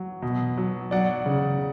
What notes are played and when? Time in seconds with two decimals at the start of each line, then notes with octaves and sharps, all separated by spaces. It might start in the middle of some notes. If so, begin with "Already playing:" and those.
Already playing: F#3
0.22 B2
0.57 F#3
0.91 F#3 D5 F#5
1.26 C#3